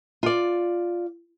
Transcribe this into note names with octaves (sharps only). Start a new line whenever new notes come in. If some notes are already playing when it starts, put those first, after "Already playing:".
F4 D5